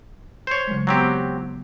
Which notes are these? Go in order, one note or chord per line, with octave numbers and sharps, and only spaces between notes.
C5 C#5
C#3 F#3 G#3
F#3 B3 C4 G4 A#5